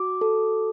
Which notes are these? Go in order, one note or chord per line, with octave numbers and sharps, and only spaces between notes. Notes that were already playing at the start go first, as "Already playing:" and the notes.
Already playing: F#4 D6
A4